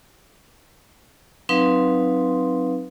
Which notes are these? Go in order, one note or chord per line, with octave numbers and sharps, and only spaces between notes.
F#3 C4 D#4 B4 F5 C6